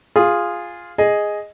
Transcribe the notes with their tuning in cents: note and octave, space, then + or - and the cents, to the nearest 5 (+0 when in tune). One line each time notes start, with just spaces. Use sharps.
F4 +0 G#4 -10
G#4 +0 D#5 +0